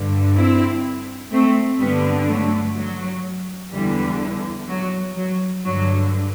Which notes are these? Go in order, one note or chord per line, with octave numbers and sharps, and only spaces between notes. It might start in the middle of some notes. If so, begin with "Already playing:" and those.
Already playing: G2 D3
C4 E4
A3 C4
G2 D3 G3 B3
F#3 A3
F#3
E2 D3 E3 G3
F#3
F#3
G2 D3 F#3